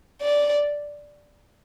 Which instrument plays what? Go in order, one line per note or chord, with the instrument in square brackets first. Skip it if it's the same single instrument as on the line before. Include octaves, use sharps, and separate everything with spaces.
[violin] D5